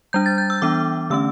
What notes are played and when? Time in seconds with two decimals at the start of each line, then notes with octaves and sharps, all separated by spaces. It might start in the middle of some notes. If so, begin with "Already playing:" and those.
0.13 G3 D4 G6
0.26 A6
0.38 G6
0.50 E6
0.62 E3 B3 D4 D6
1.10 D3 A3 C#4 E6